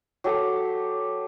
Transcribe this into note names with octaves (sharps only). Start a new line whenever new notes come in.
F#3 G4 A4 F#5